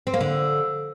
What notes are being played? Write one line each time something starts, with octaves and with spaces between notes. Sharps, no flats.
C4
A#3
D3